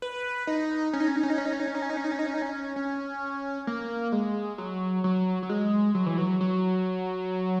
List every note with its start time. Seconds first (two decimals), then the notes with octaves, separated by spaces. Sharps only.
0.02 B4
0.47 D#4
0.93 C#4
1.00 D#4
1.08 C#4
1.16 D#4
1.23 C#4
1.30 D#4
1.38 C#4
1.45 D#4
1.53 C#4
1.60 D#4
1.67 C#4
1.75 D#4
1.82 C#4
1.90 D#4
1.97 C#4
2.04 D#4
2.12 C#4
2.19 D#4
2.26 C#4
2.34 D#4
2.42 C#4
2.76 C#4
3.67 A#3
4.12 G#3
4.58 F#3
5.04 F#3
5.43 F#3
5.49 G#3
5.95 F#3
6.06 E3
6.18 F#3
6.41 F#3